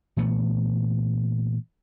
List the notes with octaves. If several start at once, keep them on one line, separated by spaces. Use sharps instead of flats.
A#2 E3 A3 B3